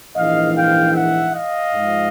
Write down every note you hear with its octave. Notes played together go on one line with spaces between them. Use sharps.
A#1 G#2 E3 D#5 F5
F5 G5
E5 F#5
D#5 F5
G#2 F3 G#3